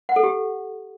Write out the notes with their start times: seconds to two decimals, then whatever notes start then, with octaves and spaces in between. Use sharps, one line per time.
0.09 F#5
0.16 A4
0.23 G4